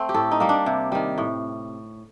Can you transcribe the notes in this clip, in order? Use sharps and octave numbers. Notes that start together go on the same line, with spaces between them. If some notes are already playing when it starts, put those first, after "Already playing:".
Already playing: A3 C4
G4
A2 A4
D#4
G3 A#3
D4
C3
D#3 G3
A2